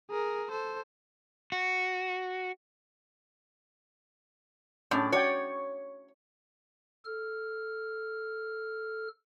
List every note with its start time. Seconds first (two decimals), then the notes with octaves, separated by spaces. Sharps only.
0.10 G#4 A#4
0.51 A4 C5
1.52 F#4
4.91 A2 C#4 D4 D5
5.12 F#4 C#5 D5 G5
7.05 A4 F6